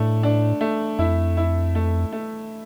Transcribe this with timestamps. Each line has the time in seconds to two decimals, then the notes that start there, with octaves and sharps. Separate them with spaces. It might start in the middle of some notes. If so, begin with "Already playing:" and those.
Already playing: A2 A3 D4
0.23 D4
0.61 A3
0.99 F2 E4
1.37 E4
1.75 A3
2.12 A3